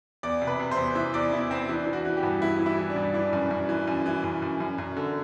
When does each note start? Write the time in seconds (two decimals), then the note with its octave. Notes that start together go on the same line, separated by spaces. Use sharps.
0.23 E2 D5
0.42 C3
0.47 B4
0.59 C3
0.71 C5
0.77 E2
0.95 E3 E5
1.14 E2 D5
1.32 E2 E4
1.50 E2 C4
1.69 E3 D4
1.87 E3
1.93 F#4
2.05 E3
2.17 G4
2.23 G2
2.41 E3 E4
2.60 E3
2.66 E4
2.78 E3
2.90 D4
2.96 G2
3.14 E3 D4
3.33 F#2
3.51 F#2
3.69 E3
3.87 F#2
4.06 E3
4.24 F#2
4.42 F#2
4.60 F#2
4.78 F#2
4.97 D3